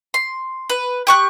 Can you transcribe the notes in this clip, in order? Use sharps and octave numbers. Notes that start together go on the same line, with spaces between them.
C6
B4
G4 C#6 F#6